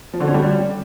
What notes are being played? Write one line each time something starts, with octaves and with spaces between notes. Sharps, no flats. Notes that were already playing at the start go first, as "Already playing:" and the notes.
F3
D3
C#4
G3